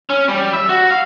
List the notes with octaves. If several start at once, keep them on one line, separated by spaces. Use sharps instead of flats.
C#4
G3
E5
F#4
F5